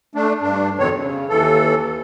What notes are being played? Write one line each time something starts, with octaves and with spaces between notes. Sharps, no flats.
A3 D4
G2 D4
F2 B2 D#3 C4 C#5
C#3
D#2 E3 A4